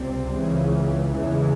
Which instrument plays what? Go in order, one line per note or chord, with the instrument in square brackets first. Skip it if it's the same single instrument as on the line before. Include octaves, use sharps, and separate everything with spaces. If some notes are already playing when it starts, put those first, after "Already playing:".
Already playing: [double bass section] C#2 C3 G3 C4
C#2 C#3 E3
E2 C#3 E3 G#3